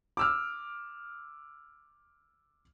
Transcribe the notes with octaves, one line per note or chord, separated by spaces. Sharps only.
D6 E6 F6